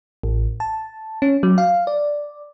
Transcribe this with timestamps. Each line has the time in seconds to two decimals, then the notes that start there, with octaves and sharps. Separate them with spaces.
0.23 A1
0.60 A5
1.22 C#4
1.43 F#3
1.58 F5
1.87 D5